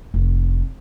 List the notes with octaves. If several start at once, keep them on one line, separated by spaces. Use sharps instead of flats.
F1